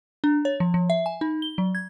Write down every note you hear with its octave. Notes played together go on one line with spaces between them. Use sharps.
D4
C#5
F3
F3
E5
G#5
D#4
G7
F#3
G#6